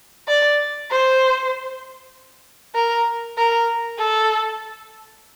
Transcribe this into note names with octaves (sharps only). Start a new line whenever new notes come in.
D5
C5
A#4
A#4
A4